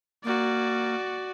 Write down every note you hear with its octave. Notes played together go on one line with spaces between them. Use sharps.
A#3 F#4 D5